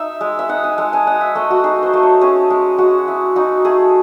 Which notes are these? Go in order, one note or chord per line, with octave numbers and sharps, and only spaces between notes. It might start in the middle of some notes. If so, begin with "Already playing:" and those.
Already playing: D#4 E5
G#3
E5
D#4 F#5
G#5
G#3 A5
G#5
D#4 F#5
E5
A3 D#5
F#4
D#4 G#4
C5
A3
C#5
C#4 G#4
G#3
G#3 F#4
E4
D#4 F#4
A3 G#4